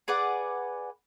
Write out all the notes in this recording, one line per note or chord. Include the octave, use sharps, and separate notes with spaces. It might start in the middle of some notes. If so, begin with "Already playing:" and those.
G#4 B4 D5 F#5